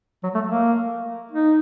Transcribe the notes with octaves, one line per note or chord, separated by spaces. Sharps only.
F#3
A3
A#3
D#4